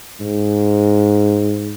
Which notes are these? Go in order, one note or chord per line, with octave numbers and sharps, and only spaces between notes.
G#2